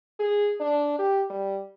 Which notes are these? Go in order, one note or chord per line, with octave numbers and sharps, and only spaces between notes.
G#4
D4
G4
G3